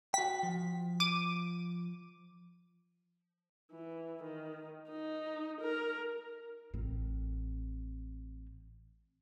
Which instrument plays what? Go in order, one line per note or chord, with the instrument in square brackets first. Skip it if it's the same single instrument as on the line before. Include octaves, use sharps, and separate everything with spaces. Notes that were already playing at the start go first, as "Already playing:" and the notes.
[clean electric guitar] F#4 G5 [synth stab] B6
[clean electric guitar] F3
[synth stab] D6 D#7
[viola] E3
D#3
D#4
A#4
[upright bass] A1 C4